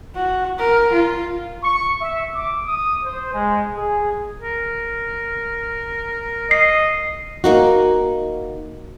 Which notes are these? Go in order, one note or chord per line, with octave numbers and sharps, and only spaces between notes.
F#4
A#4
F4
C#6
E5
D6
D#6
C5
G#3
G#4
A#4
D#5 C7
A#3 D#4 F#4